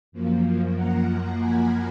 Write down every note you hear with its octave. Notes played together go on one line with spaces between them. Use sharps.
F#2 F3 A#3
F#5 A#5
G#5 B5